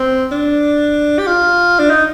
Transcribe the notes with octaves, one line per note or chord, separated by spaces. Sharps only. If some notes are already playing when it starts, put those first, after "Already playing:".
Already playing: C4
D4
G4
F4
D4
D#4